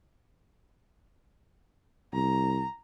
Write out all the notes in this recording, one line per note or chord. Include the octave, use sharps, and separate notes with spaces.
C2 A#5